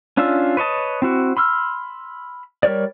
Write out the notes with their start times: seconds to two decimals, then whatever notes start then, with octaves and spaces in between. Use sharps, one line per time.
0.17 C#4 D4 F4 E5
0.57 B4 C#5 D#5 A5
1.02 C4 E4 F#4
1.37 B5 C6 E6 F6
2.63 G3 A#4 C#5 D5